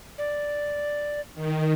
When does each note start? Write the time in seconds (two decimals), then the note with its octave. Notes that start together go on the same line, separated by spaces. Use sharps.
0.18 D5
1.34 D#3